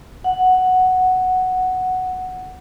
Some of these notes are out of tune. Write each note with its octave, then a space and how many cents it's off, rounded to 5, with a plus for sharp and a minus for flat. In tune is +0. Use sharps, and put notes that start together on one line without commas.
F#5 +0